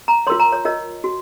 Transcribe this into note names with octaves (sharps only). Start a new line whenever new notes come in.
A#5
F4 A#4 C#5 C6
A#5
C#5
F4 A#4 C#5 D#5
F#4